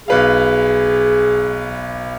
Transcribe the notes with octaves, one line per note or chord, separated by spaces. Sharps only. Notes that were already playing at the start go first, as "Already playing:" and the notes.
B1 G#4 B4 F5